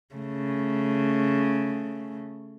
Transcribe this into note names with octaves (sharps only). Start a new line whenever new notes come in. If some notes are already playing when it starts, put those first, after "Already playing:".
C#3 A3